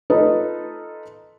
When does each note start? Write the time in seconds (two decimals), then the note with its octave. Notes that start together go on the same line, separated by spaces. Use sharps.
0.10 D#4 F4 A4 B4 D#5